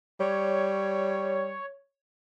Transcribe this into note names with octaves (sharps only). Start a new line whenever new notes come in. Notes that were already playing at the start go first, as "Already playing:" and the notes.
G3 C#5